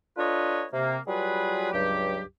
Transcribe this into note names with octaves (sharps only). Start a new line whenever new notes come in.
D4 F4 A4 B4 C#5 D#5
C3 A#3
F#3 G3 F4 G#4 B4
C#2 G2 F#3 G4